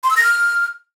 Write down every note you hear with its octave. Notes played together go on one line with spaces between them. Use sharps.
C6
E6
A#6
F6